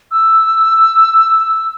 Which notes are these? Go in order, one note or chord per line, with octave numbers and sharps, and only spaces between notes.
E6